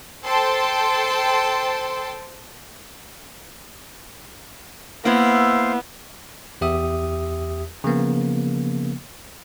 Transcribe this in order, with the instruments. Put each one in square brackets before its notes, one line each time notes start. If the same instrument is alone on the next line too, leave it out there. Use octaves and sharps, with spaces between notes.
[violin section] A4 C5 G5 A5 C6
[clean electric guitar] A#3 F#5 [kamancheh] B3 [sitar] E4 [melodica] C5 F5
[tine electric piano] E2 G4 E5 D#6
C#3 F3 A#3 B3